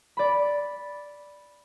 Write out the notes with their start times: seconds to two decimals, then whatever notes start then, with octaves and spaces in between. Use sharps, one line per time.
0.17 D5 B5